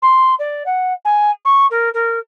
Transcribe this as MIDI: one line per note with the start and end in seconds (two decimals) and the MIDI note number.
0.02 0.35 84
0.39 0.63 74
0.66 0.93 78
1.05 1.31 80
1.45 1.67 85
1.71 1.90 70
1.94 2.19 70